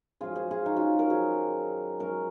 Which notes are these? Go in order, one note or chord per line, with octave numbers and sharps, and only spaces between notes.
F#2 F3 G#3 F4 G#4
G#4 C5
F4 G#4
D#4 F#4
C#4 F4
F#4 A#4
F#2 D#3 F#3 G#4 C5
F#2 F3 G#3 F#4 A#4